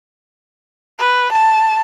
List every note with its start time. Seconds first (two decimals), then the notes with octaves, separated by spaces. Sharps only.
0.99 B4
1.32 A5